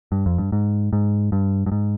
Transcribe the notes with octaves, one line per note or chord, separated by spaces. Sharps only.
G2
F2
G2
G#2
G#2
G2
G2
G#2